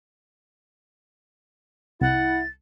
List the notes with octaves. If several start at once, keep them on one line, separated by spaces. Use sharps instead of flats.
C2 E4 F#5 A6